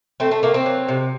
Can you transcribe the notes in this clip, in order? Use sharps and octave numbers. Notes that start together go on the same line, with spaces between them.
A3 C4
A3
A3 A#3
C4
F#3
C3